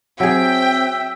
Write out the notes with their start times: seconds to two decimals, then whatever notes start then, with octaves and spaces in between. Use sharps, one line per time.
0.20 F#3 C4 G#4 E5 G5